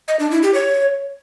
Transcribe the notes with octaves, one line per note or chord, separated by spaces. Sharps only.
D#5
D4
E4
G4
C#5